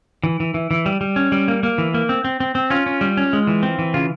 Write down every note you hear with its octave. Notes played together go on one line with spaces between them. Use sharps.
E3
E3
E3
E3
G3
G3
C#4
G3
A#3
A#3
E3
A#3
C4
C4
C4
C4
C#4 F4
C#4
G3
C#4
G#3
E3
C4
E3
C#3 F4